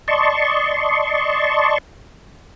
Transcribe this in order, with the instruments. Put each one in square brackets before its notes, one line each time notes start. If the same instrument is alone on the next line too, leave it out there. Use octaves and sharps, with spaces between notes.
[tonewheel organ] D5 D#5 A5 C6 C#6